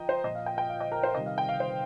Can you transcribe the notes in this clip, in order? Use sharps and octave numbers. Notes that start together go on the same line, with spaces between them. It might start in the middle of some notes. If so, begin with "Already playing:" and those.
Already playing: F3 D#5 G5 A#5
C5
A#2 F3 D#5
F5
G5
G5
F5
D#5
A#4
C5
C3 D#3 G3 D#5
F5
G5
F5
C5